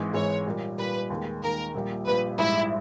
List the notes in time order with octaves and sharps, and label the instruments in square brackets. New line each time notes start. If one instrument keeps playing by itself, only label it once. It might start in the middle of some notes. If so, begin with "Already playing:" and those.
Already playing: [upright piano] G#1 G#2 E3 G#3
[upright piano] G#1 G#2 E3 G#3 [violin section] C#5
[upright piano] A#2 G3 A#3
[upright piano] A#2 G3 A#3 [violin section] B4
[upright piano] D#2 D#3 G#3
[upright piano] D#2 D#3 G#3 [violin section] A#4
[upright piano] A#1 A#2 G3
[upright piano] A#1 A#2 G3 [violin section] B4
[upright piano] A#1 G#2 G3 [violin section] E4